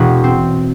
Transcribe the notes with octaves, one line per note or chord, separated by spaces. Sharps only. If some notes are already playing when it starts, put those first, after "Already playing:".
Already playing: E1 F#4
C4